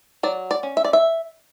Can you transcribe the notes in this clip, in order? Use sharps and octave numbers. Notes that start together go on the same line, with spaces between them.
F#3 D5
D5
C#4
E5
D5
E5